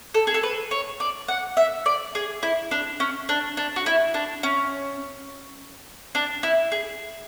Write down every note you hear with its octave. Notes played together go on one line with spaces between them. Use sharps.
A4
G#4
A4
B4
C#5
D5
F#5
E5
D5
G#4
E4
D4
C#4
D4
D4
F#4
E4
D4
C#4
D4
E4
G#4